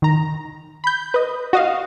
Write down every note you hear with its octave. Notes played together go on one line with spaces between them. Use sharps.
D#3 A#5
B5 G6
B4 D#5
F#4 D#5 F5